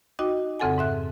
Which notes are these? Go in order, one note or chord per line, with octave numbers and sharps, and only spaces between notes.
D#4 F#4 D#5 G5 D6
F2 C#3 C4 A4 F#5 G#5
G#2 E5 F#6